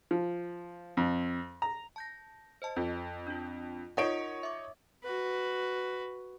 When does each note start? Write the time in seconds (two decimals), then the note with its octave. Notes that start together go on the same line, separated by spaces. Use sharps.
0.11 F3
0.97 F2
1.62 A#5
1.96 A5 G6 A#6
2.62 C5 D#5 A5
2.76 F2 A4
3.27 D4 F4
3.97 D#4 F4 A#4 C#5 F#5 D7
4.43 E5 D6
5.04 F#4 B4